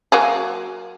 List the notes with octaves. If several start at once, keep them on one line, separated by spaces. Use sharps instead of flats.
F#3 A#3 G#4